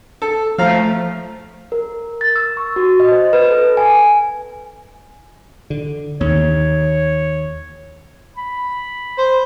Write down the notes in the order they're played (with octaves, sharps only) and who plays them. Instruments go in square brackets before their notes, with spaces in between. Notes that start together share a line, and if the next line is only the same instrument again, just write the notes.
[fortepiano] A4
[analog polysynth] F3 A3 [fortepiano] F5 A#5
[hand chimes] A#4
A6
E6
C#6
F#4
D#5
C5
B4
A4
G#5
[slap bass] D3
[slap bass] D#2 [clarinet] C#5
[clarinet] B5
[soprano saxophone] C5